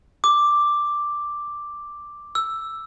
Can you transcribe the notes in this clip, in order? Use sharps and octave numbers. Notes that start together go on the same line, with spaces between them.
D6
E6